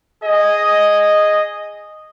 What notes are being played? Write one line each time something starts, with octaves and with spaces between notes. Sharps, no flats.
G#4 D#5